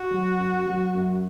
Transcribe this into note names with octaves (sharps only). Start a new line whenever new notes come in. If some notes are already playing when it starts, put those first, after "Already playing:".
Already playing: F#4
F#3
F#2
F#3
F#2